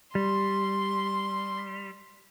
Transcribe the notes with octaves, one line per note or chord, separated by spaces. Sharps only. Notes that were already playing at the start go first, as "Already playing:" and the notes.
G3 C6